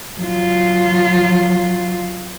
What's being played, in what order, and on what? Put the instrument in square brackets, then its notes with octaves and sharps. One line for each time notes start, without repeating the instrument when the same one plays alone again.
[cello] F#3 F4